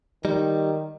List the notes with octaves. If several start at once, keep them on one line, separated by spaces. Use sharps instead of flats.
D#3 G3 D#4